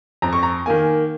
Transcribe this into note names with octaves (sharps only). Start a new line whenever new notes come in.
F2 A#5
C#6
A#5
D#3 A#3 G#5